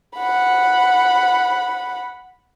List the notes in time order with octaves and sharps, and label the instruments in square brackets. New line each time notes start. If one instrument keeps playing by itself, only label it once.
[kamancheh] F#5 B5